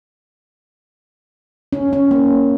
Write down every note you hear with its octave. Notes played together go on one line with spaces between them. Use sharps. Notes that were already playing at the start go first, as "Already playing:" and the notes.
C#4
C#4
A#3